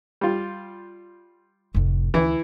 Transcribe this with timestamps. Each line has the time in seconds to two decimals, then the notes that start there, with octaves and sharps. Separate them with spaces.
0.21 G3 F4
1.74 F1 A2
2.14 D2 E3 E4